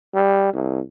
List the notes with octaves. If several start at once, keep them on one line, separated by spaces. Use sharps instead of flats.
G3
C2